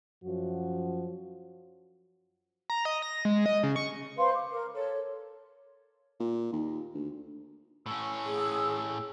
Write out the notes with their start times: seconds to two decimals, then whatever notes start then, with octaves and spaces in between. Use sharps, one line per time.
0.24 F#2 F3 F#4
2.70 A#5
2.85 D#5
3.02 A#6
3.25 G#3
3.46 D#5
3.63 C#3
3.76 C#6
4.18 B4 C5 F5 C6
4.35 D6
4.52 A#4
4.73 A4 C#5
6.20 A#2
6.52 D#2
6.94 D2
7.86 A2 C#4 E6
8.25 G#4